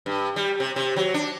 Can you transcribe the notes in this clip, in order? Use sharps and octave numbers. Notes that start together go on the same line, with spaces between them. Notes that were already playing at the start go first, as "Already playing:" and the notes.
G2
G3
C3
C3
F#3
D4